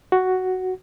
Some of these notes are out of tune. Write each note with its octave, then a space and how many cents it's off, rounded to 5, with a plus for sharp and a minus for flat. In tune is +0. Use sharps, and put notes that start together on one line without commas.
F#4 +5